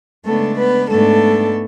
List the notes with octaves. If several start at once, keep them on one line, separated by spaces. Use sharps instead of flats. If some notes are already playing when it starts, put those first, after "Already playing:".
C#3 G#3 A3 B3 D4 A4
B3 B4
G#2 G#3 A3 B3 D4 A4